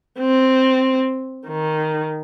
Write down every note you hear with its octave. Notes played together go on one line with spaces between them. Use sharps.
C4
D#3